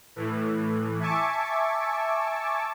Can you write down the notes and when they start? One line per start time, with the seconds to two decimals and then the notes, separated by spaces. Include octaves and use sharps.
0.16 A2 E3
1.00 E5 G#5 A5 C#6 D6